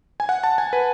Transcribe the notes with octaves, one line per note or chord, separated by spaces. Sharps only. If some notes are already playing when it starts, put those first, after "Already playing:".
G#5
F#5
A5
G#5
B4